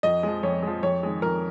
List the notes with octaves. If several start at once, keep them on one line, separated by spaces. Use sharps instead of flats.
F2 D#5
F3 G#3
F2 C#5
F3 G#3
F2 C#5
D#3 G#3
F2 A#4